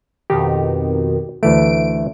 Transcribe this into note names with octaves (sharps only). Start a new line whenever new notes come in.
F2 B2 D#3 G4
D2 E3 A3 D7